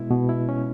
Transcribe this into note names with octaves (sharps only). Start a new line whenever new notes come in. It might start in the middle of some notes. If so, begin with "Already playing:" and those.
Already playing: B2 G#3 E4
B2
E4
C#4